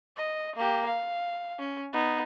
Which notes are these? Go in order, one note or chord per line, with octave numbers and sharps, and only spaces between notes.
D#5
A#3 G4
F5
C#4
B3 D#4